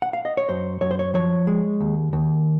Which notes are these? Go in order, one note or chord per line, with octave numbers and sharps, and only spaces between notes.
F#5
F5
D#5
C#5
F#2 C5
F#2 C#5
C5
C#5
F3 C#5
G#3
D#2
D#2